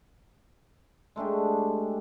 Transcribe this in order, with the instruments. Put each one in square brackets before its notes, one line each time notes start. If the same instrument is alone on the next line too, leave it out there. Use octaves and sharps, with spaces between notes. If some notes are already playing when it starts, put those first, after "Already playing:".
[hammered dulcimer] G#3 A3 D4 G4